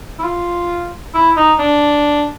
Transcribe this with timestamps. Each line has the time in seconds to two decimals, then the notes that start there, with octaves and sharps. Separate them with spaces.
0.19 E4
0.23 F4
1.14 E4
1.36 D#4
1.59 D4